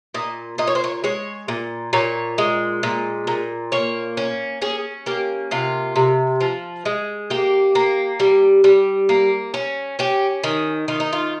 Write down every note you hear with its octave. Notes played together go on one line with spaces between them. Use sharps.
A#2 D#5
A#2 D#5
C#5
C5
C#5
G#3 C#5
A#2
A#2 C#5
G#3
A#2
A#2
A#3 C#5
C#4
C#4 G#4
A#3 G4
C3 F4
C3
F3
G#3
A#3 G4
A#3
G3
G3
A#3
C#4
C#4 G4
D#3
D#3 F4
D#4
F4